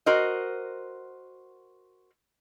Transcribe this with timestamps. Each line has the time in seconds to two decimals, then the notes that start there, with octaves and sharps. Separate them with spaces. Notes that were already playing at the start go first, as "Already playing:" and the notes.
0.06 F#4 A#4 C5 D#5